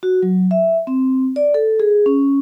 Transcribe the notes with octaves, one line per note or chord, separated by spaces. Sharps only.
F#4
F#3
E5
C4
D5
A4
G#4
C#4